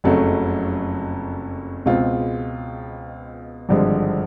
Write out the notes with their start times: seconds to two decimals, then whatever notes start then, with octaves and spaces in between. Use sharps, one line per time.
0.04 F#1 F2 C#3 F#3 A3
1.86 C#2 B2 G#3 C4 F4
3.69 G#1 G2 D3 F3 G#3